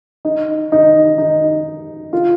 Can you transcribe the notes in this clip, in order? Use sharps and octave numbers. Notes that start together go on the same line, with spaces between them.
D#4
D#4
D#4
F4